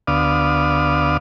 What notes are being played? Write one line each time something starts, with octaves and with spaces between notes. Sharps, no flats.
D2 B3 D5 F5 D#6